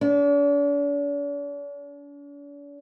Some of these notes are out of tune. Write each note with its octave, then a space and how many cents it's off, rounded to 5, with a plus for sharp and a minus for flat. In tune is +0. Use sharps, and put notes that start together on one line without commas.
D4 -45